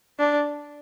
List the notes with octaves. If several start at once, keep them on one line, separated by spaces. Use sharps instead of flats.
D4